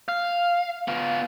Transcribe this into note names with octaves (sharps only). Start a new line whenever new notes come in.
F5
B3 F4